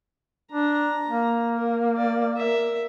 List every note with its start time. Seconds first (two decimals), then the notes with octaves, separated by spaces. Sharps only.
0.52 D4 A#5
1.08 A#3
1.58 A#4
1.97 D5
2.34 A#4 E5